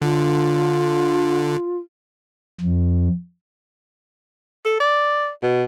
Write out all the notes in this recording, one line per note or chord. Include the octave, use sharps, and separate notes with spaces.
D3 F4
F2
A4
D5
B2